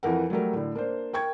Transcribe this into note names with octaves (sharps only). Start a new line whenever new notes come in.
F2 E3 A#4 F#5
F#3 G3 A3 A#4
A2 D3
A#3 D4 C5
A#4 G5 C#6 G#6